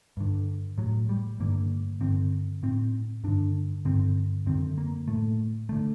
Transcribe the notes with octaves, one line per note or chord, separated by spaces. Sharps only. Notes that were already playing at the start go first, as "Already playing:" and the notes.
G2 D3
A2 F#3
G3
G2 D3 A#3
G2 D3 C4
A2 C4
G2 D3 D4
G2 D3 C4
F#2 D3 C4
A#3
A2 A3
D3 A3